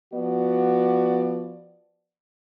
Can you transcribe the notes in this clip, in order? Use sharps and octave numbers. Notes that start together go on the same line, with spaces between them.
F3 B3 F#4 D5